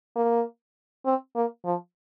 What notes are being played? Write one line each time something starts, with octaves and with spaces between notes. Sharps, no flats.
A#3
C4
A#3
F3